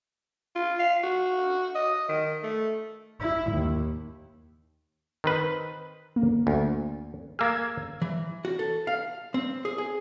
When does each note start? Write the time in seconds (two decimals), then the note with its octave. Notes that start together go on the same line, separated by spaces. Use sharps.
0.56 F4
0.80 F5
1.03 F#4
1.75 D#5
2.09 D#3
2.43 A3
3.20 E4
3.51 D#2
5.24 D#3 C4 B4
6.16 A#3
6.47 D2
7.39 A#3 G#4 E6 G#6
8.02 E3
8.45 F#4
8.59 A4
8.87 F5
9.34 C4
9.65 G#4
9.78 G#4